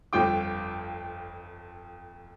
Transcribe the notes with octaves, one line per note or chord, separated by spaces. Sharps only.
G1 F2 F4 G5 D6